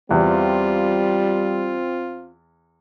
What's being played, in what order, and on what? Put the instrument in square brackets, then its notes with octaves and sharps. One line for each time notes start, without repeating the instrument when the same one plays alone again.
[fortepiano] E2 [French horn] G3 [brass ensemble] C4 F4